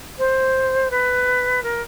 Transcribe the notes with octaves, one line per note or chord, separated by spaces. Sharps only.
C5
B4
A#4